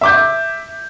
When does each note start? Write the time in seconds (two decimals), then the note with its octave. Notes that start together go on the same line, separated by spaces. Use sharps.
0.01 E5 D6 G6